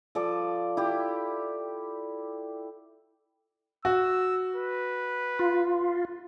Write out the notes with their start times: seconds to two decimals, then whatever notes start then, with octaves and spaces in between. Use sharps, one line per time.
0.15 F3 A4 D5
0.77 E4 G4
3.85 F#4 E6
4.55 B4
5.39 F4